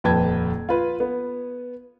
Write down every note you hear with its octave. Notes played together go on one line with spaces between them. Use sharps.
D#1 F2 B4 G5 A5 G#6
F4 B4
B3